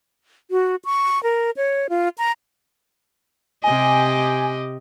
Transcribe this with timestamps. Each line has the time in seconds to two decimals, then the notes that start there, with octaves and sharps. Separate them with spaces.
0.51 F#4
0.85 C#6
1.23 A#4
1.57 C#5
1.90 F4
2.18 A#5
3.64 C3 G4 D#5 G#5